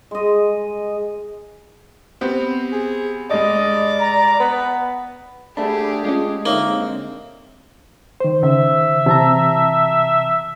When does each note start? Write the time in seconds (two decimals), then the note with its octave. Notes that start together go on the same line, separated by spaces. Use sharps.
0.11 G#3 D#5
2.21 B3 C4 G4
2.72 G#4
3.30 G2 G#3 D5 D#5
4.00 A#5
4.40 B3 B4
5.57 A3 D4 G4 G#4 B5
6.04 G#3 C#4 F4
6.46 D3 A#3 C4 D#4 C#5 E5
8.20 D#3 C5
8.43 C#3 E5
9.06 C3 E3 A5 A#5